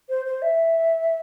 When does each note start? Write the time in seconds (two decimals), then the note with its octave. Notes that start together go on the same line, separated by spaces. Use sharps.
0.09 C5
0.26 C5
0.42 E5